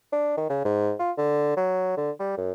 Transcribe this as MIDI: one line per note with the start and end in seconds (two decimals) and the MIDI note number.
0.13 0.37 62
0.37 0.46 51
0.50 0.61 49
0.65 0.93 44
0.99 1.11 65
1.17 1.55 50
1.57 1.93 54
1.97 2.11 50
2.20 2.33 55
2.38 2.52 42